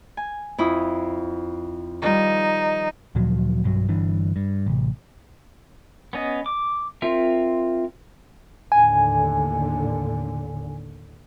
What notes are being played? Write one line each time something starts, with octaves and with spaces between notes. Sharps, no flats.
G#5
F2 E4 D#6
D#3 F3 G3 D#4
D2 A#2 F3 F#3
B1 G2 F#3
G1 G2 E3 D4
G2
A1 C3
B3 C#4 D#5
D6
C4 F4 A#4 E5
D#2 A2 D3 G#5